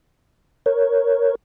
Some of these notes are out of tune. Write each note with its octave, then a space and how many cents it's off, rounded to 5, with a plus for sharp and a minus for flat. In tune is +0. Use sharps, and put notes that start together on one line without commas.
A#4 +0 C#5 +0